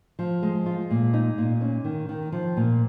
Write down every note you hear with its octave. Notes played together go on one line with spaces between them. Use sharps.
F3
G#3
F4
A#2
D#4
A#2
C#4
D#3
D#3
F3
A#2